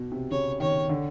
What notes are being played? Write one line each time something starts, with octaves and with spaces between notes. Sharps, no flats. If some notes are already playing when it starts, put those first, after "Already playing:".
Already playing: B2
C3
C#3 C#5
D#3 C#5
D3